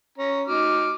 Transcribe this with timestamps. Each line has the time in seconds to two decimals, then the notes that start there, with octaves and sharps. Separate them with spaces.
0.18 C#4 A#5
0.47 D#4 F#4 D6 F6